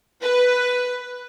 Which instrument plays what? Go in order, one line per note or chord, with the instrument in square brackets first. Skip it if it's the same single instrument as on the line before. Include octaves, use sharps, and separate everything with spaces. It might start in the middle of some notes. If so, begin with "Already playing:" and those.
[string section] B4